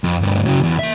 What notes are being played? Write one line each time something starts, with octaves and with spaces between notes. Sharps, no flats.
F2
D2 G2
C#3 F#3
E2
A#3 E5